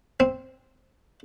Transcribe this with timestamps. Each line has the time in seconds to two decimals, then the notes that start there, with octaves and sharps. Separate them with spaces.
0.20 C4